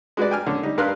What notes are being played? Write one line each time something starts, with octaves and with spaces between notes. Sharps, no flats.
G#3 F#4 B4 D5
G5 G#5 F6
D3 C#4
G3 D#4
G2 A#4 B4 F5 C6 F#6